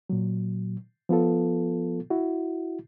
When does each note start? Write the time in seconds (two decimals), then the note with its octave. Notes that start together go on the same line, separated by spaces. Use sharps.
0.10 A#2 F#3
1.09 F3 B3 F4 A4
2.10 E4 F#4